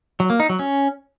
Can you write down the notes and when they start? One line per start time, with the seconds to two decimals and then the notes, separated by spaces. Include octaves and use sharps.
0.20 F#3
0.30 A#3
0.40 D#4
0.49 F#3
0.59 C#4